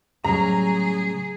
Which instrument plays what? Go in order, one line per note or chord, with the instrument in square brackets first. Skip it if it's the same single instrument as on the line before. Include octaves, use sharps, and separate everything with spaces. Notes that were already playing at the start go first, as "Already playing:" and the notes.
[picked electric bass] A2 C#3 G3 [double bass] F#3 [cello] G#4 [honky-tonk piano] A#5